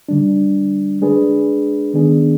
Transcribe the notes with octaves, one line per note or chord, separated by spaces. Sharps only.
D3 G3 D4
G#3 D4 G#4 B4
D#3 B3 D4 G#4